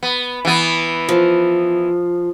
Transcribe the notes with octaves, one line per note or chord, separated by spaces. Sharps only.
B3
E3 B3
F3